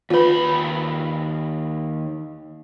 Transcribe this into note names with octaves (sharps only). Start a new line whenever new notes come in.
D#2 F4 B4 B5